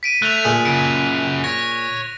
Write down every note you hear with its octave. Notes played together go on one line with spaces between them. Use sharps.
B6 D7 D#7
A3 F#6 F7
A#2 G#4
F#2 C#3 D7
C#5 A#6